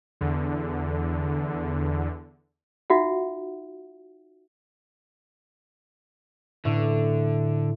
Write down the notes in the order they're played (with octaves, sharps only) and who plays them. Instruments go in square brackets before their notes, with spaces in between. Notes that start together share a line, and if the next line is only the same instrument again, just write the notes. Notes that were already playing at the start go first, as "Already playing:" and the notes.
[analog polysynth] E2 D3
[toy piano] D#4 F4 F#4 E5 F#5
[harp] A2 [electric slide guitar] D3